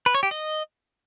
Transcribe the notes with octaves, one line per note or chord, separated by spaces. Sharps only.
B4
C#5
G4
D#5